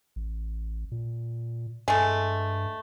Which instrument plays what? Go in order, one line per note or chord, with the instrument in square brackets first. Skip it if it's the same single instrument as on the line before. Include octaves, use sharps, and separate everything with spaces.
[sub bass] A1
A#2
[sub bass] G2 [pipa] G#3 A3